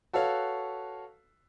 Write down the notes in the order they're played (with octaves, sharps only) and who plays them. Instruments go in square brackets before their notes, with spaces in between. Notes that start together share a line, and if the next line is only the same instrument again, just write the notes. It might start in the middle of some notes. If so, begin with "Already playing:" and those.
[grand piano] F#4 A4 B4 C#5 F5